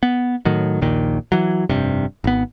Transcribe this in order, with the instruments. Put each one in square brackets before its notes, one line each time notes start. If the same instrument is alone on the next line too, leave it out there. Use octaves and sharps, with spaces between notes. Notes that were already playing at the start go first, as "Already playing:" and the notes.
[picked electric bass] B3
A2 D#3 F#3
A#1 D#2 A#2 D#3
E3 F#3
F1 G2 C3
G#1 B3